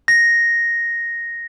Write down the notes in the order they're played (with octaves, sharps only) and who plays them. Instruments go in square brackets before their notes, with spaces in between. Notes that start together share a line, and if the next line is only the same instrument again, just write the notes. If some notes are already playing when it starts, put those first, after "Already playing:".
[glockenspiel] A#6